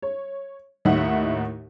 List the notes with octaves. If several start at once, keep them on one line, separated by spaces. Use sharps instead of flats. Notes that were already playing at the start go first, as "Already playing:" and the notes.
C#5
D#2 A2 D#4 E5 F#5